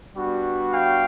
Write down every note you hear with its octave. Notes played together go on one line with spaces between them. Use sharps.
G3 B3 D4 F#4
F5 G5